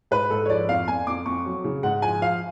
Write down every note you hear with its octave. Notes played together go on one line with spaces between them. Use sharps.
G#2 B4
G#2 A4
C#5
F3 D5
F2 F5
F2 G#5
F2 D6
F2 C#6
F#3
C#3
G#2 F#5
F3 G#5
F3 F5